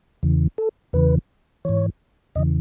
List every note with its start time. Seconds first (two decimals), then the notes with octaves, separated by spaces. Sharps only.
0.23 E2 C#3 E3
0.58 A4
0.93 E2 C#3 E3 B4
1.65 G#2 E3 C#5
2.35 E2 C#3 E3 D#5